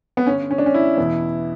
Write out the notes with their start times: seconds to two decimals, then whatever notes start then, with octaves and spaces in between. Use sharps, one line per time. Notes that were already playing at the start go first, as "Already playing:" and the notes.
0.17 B3
0.27 G2 D3 C#4
0.51 C#4
0.58 D4
0.66 C#4
0.74 E4
0.97 E2 B2